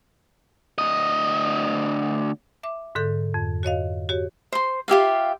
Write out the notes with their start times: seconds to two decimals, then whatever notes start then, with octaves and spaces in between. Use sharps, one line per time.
0.78 D2 D#5
2.63 E5 D6
2.95 G#2 D3 A4 G6
3.34 F2
3.63 F#4 C#5 D#5 F5
4.09 F#4 G4 C#5
4.52 C5 C6
4.88 F4 G4 E5 F5